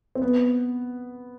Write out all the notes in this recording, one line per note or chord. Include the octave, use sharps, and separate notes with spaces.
C4
B3